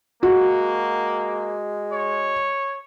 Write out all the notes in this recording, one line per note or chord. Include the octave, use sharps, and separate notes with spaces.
G#3 A#3 F#4
C#5